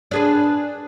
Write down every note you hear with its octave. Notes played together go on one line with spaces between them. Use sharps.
D4 G#4 B4